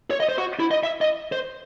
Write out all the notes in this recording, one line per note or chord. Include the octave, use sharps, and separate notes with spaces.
C#5
D#5
C5
F#4
E4
D#5
E5
D#5
C5